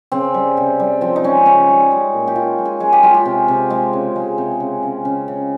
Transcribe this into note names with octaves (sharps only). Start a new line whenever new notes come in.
C#3 C4
G3
C3
G3
F3 C4
D#4
G#3 C#4
C#3 C#4
G3
G#3
A#2
G4
G#3 F4
G#3
G#4
G#3 G#4
G4
G#3 F4
G4
C3
C3
G#3
C#3
G#3
C3
C#3
C#3
C#3
C#3